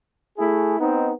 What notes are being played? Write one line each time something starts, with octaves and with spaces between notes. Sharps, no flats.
A3 E4 G#4
B3 C4 D#4